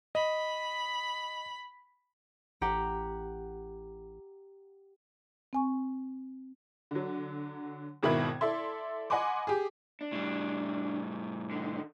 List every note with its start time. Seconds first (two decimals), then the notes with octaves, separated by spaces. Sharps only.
0.15 D#5 B5
2.61 A1 G4 F#5 A#5
5.53 C4 G#5 C#6
6.91 D3 F#3
8.03 G#1 B2 D#3 E4 B5 G#6
8.41 E4 A4 D5 E5 C6
9.10 D#5 F#5 G#5 B5 C6 D6
9.47 G4 G#4
10.01 D4
10.12 A2 G3
11.51 D3 D#3